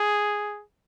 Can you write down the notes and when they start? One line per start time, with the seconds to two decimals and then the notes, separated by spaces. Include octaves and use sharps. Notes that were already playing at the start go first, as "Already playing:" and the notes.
Already playing: G#4